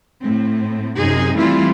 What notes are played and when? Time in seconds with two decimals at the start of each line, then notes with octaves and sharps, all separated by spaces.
0.20 A2 C4
0.96 F#2 C3 D#4 G#4
1.34 E3 G3 A3 C4 E4 F4